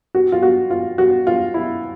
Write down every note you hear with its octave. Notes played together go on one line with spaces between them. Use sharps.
F#4
F4
F#4
F4
F#4
F4
E4